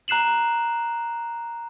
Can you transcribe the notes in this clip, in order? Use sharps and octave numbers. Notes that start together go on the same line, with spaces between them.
A#5 F#6 C7 E7 F#7